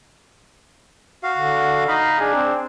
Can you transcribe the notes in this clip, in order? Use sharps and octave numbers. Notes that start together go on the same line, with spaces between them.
F#4 F5
D3
D#4 D#5 F5 B5
D4 G#4
C4